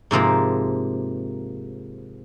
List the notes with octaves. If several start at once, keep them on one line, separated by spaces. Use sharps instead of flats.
G#2 C3 F3 A#3